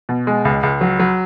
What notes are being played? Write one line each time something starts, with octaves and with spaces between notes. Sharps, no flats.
B2
G#3
C#2
C#2
F#3
F#3